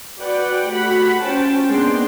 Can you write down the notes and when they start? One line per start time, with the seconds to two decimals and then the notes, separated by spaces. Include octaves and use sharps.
0.19 F#4 B4 D5 F#5 G5
0.68 A3 F#4 G4 F#5 B5
1.21 C#4 F4 C5 G5 A5
1.69 G#3 A#3 B3 D4 G5 C6